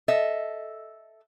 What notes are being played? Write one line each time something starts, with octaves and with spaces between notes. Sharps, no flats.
A4 D#5 E5